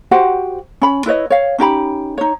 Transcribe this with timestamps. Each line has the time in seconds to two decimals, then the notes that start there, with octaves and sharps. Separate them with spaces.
0.11 F#4 G4 C5 F#5
0.82 C#4 B5
1.06 E4 B4 C#5 D#5
1.30 C#5 F5
1.58 C#4 D#4 G4 B5
2.18 D#4 C#5